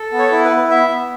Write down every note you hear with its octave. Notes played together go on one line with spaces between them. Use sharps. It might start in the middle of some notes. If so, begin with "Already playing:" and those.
Already playing: A4
B3
C#5
E4
B4
B3
B3 E5
B3